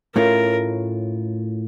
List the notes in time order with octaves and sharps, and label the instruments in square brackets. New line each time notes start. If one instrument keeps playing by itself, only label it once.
[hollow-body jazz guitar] A2 A3 C#4 F4 [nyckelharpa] A#4